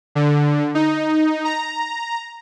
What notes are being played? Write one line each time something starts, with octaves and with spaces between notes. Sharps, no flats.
D3
D#4
A#5